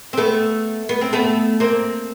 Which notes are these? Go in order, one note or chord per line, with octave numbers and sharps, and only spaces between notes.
C4
A3 B3
B3
C4
A3 B3
A#3 C4